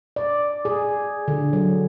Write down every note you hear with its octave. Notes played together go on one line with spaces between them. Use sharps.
D5
G#4
D3
F#3